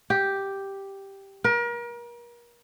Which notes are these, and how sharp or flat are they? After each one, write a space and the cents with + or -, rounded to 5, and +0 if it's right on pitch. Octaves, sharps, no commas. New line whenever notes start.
G4 +0
A#4 +35